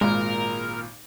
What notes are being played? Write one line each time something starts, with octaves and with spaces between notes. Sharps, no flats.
G#1 A#2 G#3 A#4